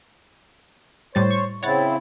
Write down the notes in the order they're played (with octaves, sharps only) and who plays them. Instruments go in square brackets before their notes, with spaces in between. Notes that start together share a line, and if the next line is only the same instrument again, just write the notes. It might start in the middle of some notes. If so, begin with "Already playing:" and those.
[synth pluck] A2 G3 A6 [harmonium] C5 C#5
[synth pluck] C#6
[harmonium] C#3 C4 E4 [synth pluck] C#5 F#5 A6